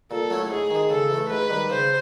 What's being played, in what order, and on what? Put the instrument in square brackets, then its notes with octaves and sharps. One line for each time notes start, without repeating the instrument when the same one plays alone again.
[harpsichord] A#2 [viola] A4
[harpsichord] F#3 A3 C#4 E4
[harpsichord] G#2 [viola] G#4
[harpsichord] D#3 G#3
[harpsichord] C#3 [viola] A4
[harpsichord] E3 A3
[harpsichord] G#2 [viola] B4
[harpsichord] D#3 G3
[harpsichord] C#3 [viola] C5